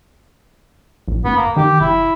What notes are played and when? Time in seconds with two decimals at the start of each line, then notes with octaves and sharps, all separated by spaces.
1.08 A#1
1.25 F#1 B3
1.37 A#3
1.56 D#3 G4
1.81 F#1 E4